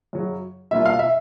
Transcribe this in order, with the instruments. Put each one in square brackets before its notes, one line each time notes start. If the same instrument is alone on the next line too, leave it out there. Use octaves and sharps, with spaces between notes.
[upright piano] F#2 C#3 F#3
B2 G3 A#3 D4 F4 E5
F5
E5